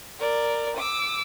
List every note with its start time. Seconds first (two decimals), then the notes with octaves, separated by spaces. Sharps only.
0.19 A#4 D5
0.76 D6 E6